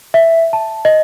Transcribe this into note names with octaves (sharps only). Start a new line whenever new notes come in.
E5
A5
D#5